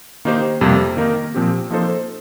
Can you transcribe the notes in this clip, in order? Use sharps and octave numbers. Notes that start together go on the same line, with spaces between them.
D#3 A#3 D#4 G4 C5
F2 C3 G3 A#3
D#3 A#3 D#4 A#4
A#2 F3 C4 G4
F3 A#3 D#4 A4 C5